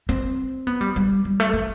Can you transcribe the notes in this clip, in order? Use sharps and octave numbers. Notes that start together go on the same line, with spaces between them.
C4
B3
G3
G3
G3
A3
A3